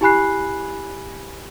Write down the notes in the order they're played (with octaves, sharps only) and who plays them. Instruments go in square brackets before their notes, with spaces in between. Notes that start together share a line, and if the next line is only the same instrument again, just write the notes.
[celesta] E4 G4 G#5 B5 F#6 C7